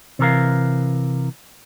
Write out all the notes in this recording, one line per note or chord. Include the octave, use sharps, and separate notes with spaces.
C3 E3 A#4 F5